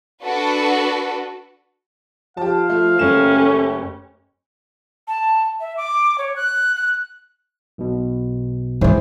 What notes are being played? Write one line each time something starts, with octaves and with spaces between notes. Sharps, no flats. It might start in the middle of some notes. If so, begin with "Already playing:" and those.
D4 F#4 A4 B4
F3 G4 F5 A5
A3 F4
F#1 A3 C#4 G4 E7
A3
A5
E5
D6
C#5
F#6
F#6
B1 B2
G#2 D#3 E3 C5